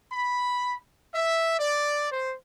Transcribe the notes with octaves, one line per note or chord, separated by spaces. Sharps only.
B5
E5
D5
C5